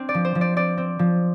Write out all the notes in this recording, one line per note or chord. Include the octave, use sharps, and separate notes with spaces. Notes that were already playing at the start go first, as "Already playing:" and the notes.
Already playing: C4 D4
D5
F3
C5
F3
D5
C4 D5
C4
F3